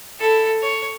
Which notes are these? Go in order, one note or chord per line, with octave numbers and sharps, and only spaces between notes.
E4 A4
C#5